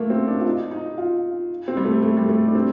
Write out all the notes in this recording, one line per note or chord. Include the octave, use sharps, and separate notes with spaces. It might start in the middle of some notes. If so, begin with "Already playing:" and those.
Already playing: A3 A#3
C4
D4
F4
D#4
D#4
F4
C4
G3
A3
A3
G3
A3
D4
C4